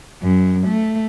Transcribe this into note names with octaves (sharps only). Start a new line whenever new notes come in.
F#2
A3